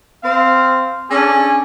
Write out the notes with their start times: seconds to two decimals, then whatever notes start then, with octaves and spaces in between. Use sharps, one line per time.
0.23 C4 C5 F5
1.10 C#4 D4 G#4 A4